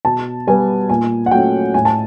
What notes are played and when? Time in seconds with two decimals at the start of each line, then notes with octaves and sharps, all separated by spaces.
0.05 B2 A5
0.47 G3 B3 G#5
0.89 A#2 G#5
1.26 F#5
1.31 F#3 A3 C#4 G5
1.74 A2 G#5
1.85 A5